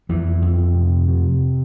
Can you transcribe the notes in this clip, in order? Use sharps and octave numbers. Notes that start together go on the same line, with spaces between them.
F2 E3
F2
C3
C3